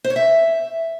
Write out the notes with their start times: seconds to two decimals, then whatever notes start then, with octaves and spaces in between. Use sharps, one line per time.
0.04 C5
0.10 C#5
0.16 E5